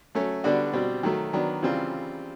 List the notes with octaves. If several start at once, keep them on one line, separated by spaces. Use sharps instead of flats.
F#3 A3 C#4
D3 G3 B3 D4 F#4
B2 G3 C4
D#3 F#3 A3
D#3 F#3 B3 D4
C#3 E3 G3 C4 F4